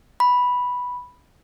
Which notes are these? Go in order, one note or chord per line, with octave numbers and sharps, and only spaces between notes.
B5